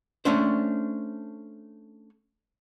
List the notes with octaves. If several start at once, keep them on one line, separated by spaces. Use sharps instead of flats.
A3 C#4 D4 C5